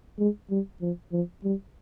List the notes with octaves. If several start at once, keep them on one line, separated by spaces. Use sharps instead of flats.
G#3
G3
F3
F3
G3